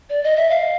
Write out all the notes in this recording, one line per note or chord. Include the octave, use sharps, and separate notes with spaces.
D5
D#5
E5
F5